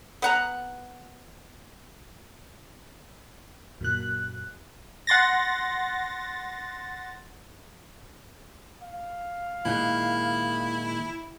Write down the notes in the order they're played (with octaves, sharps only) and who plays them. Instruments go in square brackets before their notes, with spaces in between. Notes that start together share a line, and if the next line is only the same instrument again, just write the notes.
[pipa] B3 F#5 A#5
[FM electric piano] F#2 A#2 F#6
[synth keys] F#5 C6 A6 A#6
[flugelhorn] F5
[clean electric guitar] A#2 D#3 G#3 [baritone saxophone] E4